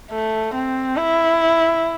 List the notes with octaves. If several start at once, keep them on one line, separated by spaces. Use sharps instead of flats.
A3
C4
E4